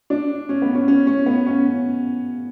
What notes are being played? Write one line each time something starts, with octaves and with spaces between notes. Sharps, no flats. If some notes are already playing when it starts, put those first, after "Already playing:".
D4
C#4
B3
C#4
C#4
C#4
B3
C#4